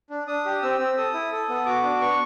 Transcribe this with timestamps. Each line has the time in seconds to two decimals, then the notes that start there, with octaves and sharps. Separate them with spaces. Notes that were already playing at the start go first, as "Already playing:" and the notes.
0.10 D4
0.27 D4 D#6
0.45 G4
0.62 C4 E6
0.79 C4
0.97 A4 D#6
1.14 E4
1.32 A4
1.49 B3
1.66 F#4 D6
1.83 D4
2.01 B3 C#6